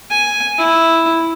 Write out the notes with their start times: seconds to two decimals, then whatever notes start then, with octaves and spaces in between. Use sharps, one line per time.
0.10 G#5
0.58 E4